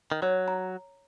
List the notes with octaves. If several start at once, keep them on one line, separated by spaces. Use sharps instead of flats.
D#3
F#3 C#5
A#5